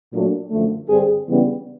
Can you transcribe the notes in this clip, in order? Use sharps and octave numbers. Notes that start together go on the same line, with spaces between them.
A#2 F#3 A3 D4
F#2 D3 F3 A3
G2 D3 G3 C4 G#4
C#3 E3 G3 B3 D4